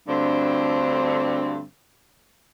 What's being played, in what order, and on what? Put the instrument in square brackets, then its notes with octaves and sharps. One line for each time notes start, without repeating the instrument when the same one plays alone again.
[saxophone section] D2 G2 D3 C4